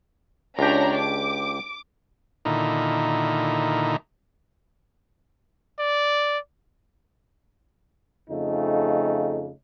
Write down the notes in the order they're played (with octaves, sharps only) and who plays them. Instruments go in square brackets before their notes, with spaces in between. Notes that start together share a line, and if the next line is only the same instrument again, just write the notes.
[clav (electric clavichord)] C#2 G4 [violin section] D4 C#5 A#5
[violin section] D6
[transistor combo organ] A#2 D3 D#3 D#4 E4
[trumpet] D5
[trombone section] F2 C#3 A3 D#4